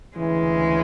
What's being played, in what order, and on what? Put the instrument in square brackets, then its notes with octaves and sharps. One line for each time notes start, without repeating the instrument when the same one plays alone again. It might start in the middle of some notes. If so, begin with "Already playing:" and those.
[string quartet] D2 C#3 G#3 [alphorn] E3